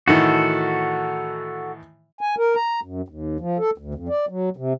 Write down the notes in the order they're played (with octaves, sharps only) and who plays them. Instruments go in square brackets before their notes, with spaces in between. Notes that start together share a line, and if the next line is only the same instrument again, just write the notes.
[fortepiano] A2 D#3 E3 [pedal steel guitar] F#4 A4
[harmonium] G#5
A#4
A#5
F#2
D#2
F3
A4
D2
F2
D5
F#3
C3